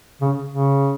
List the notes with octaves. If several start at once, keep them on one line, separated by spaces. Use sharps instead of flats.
C#3
C#3